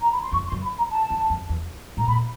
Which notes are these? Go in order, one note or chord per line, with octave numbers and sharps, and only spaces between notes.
A#5
B5
C6
F2 C#6
C6
F#2
B5
A#5
A5
E2
F2
E2
A2 A#5
A#2 B5